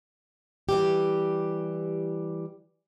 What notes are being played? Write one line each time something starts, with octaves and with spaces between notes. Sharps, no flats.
E3 G3 G4